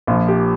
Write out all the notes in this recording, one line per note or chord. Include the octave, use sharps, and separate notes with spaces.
A#1 A#2 F3 F4
G4